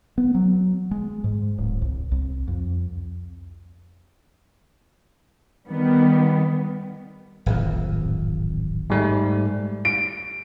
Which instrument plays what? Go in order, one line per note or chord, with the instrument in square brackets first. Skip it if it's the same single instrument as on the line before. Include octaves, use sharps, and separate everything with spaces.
[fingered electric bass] B3
F#3
G#3
G#2
D1
C2
C2
F2
[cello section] D#3 G3 B3
[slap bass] D1 G#1 F2
[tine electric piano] G#2 G3 A3
[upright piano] D7